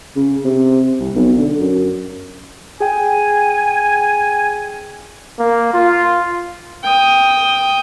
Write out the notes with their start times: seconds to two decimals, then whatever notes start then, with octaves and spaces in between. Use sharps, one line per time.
0.16 C#3
0.45 C3
1.00 C2
1.16 B1
1.37 D3
1.60 F#2
2.80 G#4 G5 G#5
5.39 A#3
5.73 F4
6.84 G5 D#6